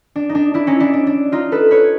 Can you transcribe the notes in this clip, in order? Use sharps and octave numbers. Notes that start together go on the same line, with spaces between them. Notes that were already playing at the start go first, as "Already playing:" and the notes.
D4
D#4
D4
D4 E4
C#4 D#4
D4 E4
D4
D4
D#4 F4
A4 B4
B4 C#5